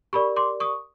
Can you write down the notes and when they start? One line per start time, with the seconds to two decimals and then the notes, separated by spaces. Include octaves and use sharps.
0.13 G4 A#4 D5 B5 C#6
0.36 C6 D6
0.60 C#6 D#6